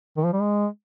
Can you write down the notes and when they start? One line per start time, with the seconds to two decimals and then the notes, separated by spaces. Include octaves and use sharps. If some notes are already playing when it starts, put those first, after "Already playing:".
0.17 D#3
0.25 F3
0.33 G3
0.40 G#3